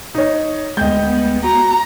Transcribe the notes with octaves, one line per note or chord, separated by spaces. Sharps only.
D#4 C#5
D2 G#3 B3 D#5 G5 G6
F#4 A#5